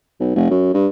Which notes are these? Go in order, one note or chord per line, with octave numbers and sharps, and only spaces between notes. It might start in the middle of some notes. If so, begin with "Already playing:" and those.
B1
F1
F#2
G2